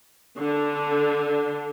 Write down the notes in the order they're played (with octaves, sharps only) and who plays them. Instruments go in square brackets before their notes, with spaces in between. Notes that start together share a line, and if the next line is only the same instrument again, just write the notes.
[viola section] D3